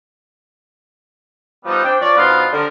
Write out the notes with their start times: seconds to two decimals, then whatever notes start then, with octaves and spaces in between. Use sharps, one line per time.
1.65 F3 G3 B3 D#4
1.84 C4 D4 G5
2.00 F3 C#5 D5
2.16 B2 F3 B3 D4 D#4 F4
2.52 D3 F3 G3 A#4